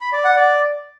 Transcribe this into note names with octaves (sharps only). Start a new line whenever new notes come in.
B5
D5
F#5
D5